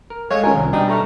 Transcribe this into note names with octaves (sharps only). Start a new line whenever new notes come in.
A#4
G#3 A3 C#5 D#5 F5 C#6
D#3 C#4 F4 A#4 G#5
C2
B2 G3 D4 D#4 G5
A3 A#5 C#6 F6